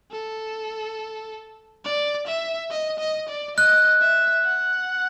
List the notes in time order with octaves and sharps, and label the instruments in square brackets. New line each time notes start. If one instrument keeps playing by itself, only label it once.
[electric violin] A4
D5
E5
D#5
D#5
D5
[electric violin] D#5 [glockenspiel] F#6
[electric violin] E5
F#5